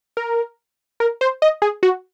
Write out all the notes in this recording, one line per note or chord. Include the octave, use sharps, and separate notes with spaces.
A#4
A#4
C5
D#5
G#4
F#4